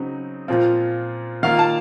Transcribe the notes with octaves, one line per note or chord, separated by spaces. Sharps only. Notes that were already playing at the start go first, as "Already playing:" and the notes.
Already playing: C#3 F#3 C4 D#4
A#2 F3 C4 F4
D#3 A#3 F4 F5
A5